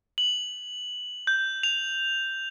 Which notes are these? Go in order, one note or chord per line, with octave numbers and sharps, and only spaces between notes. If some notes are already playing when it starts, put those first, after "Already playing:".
F#7
G6
F7